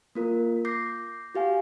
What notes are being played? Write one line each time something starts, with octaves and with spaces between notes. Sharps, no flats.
A#3 F4 A#4
D6 G6 A#6 C7
F#4 G4 F5 G#5